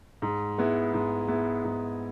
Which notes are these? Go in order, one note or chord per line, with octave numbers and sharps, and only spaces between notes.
G#2
G#3 B3 E4
G#2
G#3 B3 E4
G#2